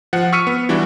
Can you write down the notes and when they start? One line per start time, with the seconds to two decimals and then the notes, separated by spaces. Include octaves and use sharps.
0.13 F3 F#5
0.33 C#6 E6 F6 B6 C#7 D#7
0.47 B3
0.69 E3 G3 D4 E4 F#4